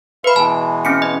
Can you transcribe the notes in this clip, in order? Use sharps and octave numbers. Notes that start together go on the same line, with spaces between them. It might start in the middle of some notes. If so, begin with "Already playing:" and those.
B4 E5 F5 B5 C6
B2 E3 G#3 A5
C4 C#4 C#7
D#5